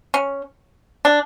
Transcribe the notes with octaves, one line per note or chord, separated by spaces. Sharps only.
C#4
D4